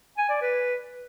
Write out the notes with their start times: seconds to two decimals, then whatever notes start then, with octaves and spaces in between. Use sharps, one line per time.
0.18 G#5
0.30 D5
0.41 B4